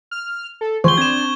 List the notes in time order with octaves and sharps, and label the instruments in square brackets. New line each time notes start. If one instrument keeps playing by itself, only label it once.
[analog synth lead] F6
A4
[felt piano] F3 [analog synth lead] G#4 [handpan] C5 [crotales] C#6 G7
[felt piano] C4 [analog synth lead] D4 [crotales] G#6 E7